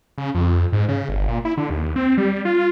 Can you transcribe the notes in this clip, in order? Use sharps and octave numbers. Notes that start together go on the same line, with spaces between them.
C#3
F2
G#2
C#3
G1
A#2
E4
D3
D#2
C4
G3
F4